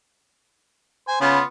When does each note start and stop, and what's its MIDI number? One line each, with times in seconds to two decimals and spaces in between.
1.08 1.18 72
1.08 1.18 80
1.21 1.39 49
1.21 1.42 59
1.21 1.42 65